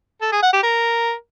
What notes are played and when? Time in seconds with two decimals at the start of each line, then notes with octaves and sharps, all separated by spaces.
0.22 A4
0.32 G#4
0.43 F#5
0.53 G4
0.64 A#4